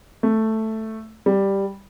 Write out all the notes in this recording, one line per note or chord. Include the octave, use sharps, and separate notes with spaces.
A3
G3